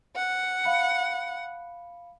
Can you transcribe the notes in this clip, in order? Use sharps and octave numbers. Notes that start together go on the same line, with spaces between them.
F#5
F5 B5 C#7